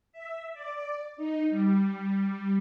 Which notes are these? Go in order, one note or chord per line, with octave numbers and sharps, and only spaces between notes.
E5
D5
D#4
G3